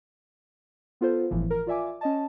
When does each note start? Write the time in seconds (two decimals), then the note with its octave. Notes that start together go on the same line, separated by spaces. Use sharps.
1.01 B3 F4 A4 C5
1.31 G1 A2 E3 F3
1.50 A#4
1.67 F4 D5 E5 G#5 D6
2.01 C#4 D#5 A5